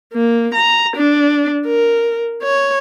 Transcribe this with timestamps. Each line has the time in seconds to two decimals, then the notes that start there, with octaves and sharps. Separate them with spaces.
0.13 A#3
0.55 A#5
0.97 D4
1.66 A#4
2.43 C#5